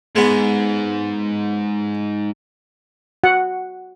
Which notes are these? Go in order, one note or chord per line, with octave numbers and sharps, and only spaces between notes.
G#2 G#3 B3
F#4 F#5